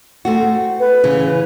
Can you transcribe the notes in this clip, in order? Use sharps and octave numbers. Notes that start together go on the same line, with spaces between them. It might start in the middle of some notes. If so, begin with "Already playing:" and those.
A3 C4 F#4
B4
C#3 E3